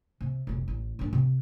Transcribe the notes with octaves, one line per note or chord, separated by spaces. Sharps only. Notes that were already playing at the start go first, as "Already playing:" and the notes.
C3
F1 B1
A1
G#2 D4
C3